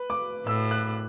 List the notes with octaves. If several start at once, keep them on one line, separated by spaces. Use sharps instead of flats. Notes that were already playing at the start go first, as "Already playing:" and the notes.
Already playing: B4
D6
A2 E6
F#6